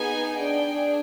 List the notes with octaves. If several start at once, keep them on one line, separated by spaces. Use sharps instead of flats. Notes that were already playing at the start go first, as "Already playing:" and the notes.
Already playing: B3 D#4 G#4 G#5
D4 G#4 G5